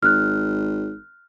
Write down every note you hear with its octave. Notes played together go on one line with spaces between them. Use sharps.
G#1 F6 F#6